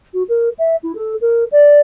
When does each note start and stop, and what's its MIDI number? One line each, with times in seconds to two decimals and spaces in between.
0.14 0.23 66
0.29 0.49 70
0.59 0.76 76
0.83 0.92 64
0.95 1.14 69
1.21 1.44 70
1.52 1.80 74